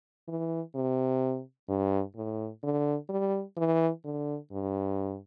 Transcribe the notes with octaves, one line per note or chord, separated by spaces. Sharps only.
E3
C3
G2
A2
D3
G3
E3
D3
G2